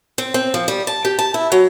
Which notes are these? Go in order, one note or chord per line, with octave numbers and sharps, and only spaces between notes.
C4
C4
F3
G3
A5
G4
A5
E4
F#3